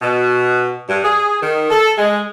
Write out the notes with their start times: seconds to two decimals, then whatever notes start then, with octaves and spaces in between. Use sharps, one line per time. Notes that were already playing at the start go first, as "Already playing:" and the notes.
0.02 B2
0.89 G2
1.03 G#4
1.42 D#3
1.70 A4
1.97 G#3